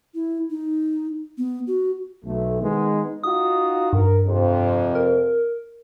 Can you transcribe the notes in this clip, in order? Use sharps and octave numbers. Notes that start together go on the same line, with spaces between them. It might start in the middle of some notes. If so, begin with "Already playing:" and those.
E4
D#4
B3
F#4
B1 A3
D#3 G#3 B3 D#4
D#4 F4 F#4 D#6
G2 A#4
F2 C3
A#4